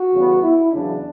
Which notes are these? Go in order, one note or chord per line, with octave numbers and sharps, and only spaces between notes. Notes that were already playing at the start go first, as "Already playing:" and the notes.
Already playing: F#4
E2 C#3 G3 B3
E4
E2 C#3 F#3 D4